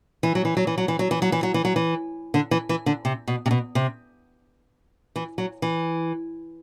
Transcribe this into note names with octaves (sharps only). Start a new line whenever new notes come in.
E3
F#3
E3
F#3
E3
F#3
E3
F#3
E3
F#3
E3
F#3
E3
F#3
E3
D3
E3
E3
D3
C3
B2
C3
B2
C3
E3
F#3
E3